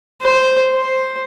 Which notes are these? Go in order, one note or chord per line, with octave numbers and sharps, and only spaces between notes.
C5
C5